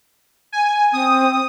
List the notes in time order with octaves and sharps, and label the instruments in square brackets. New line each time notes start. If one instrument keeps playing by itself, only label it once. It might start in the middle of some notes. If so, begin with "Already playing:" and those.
[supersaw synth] G#5
[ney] C4 [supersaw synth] D#6